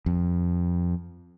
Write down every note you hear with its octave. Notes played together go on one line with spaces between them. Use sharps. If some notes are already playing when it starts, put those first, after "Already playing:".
F2